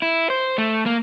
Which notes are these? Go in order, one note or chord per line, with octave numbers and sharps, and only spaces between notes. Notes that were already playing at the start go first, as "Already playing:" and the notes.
E4
C5
A3
A#3